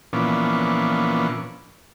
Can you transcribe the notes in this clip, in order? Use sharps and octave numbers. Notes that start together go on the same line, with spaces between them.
A#2 E3 F3 B3 C#4 D4